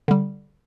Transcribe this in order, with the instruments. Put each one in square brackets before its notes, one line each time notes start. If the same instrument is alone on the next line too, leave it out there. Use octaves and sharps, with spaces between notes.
[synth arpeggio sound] D3 G3